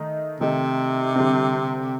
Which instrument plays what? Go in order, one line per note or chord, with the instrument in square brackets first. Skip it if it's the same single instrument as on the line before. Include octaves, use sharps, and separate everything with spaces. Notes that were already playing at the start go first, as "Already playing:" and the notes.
Already playing: [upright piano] D#3 A3 D#4
[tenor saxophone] C3 [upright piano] D#3 A3 D#4
[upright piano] D3 G3 C4